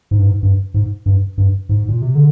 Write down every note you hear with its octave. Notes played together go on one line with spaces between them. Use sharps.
G#2
G2
G#2
G2
G#2
G2
G2
G#2
A#2
C3
D3